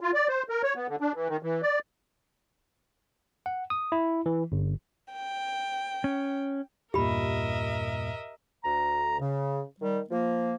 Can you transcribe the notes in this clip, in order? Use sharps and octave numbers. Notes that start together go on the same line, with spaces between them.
F4
D5
C5
A#4
C#5
B3
D3
D4
E3
D#3
E3
D5
F#5
D#6
E4
E3
G1
G5
C#4
E2 G2 A#2 G4 A#4 D#5 E5 B5
D2 A#5
C#3
D#3 G3
F3 A#3